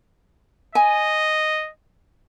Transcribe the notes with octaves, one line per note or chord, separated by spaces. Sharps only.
D#5 G#5